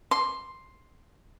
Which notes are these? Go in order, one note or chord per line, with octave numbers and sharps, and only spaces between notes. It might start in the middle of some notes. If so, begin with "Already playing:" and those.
C6